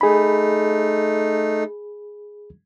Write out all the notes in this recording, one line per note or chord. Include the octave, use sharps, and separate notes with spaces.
A3 D#4 G#4 B5